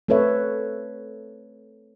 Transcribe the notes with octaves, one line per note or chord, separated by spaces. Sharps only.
A3 C4 A4 B4 C#5 E5